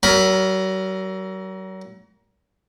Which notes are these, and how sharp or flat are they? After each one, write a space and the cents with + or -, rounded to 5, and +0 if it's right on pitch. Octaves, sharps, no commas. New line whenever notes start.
F#3 +40 A#4 +0 B5 +0